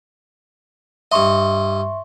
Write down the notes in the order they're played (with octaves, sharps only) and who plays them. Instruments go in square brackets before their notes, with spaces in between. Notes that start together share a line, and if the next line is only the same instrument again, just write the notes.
[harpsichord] G2 D#5 [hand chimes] E5 C6 C#6